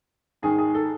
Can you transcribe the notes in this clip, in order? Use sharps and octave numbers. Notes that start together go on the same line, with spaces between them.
G#2 D#3 G#4
G#4
A4